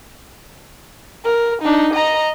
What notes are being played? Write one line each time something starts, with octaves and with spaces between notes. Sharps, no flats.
A#4
D4 D#4
D#5 A#5